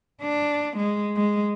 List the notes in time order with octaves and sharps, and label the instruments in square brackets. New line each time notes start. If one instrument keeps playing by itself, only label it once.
[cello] D4
G#3
G#3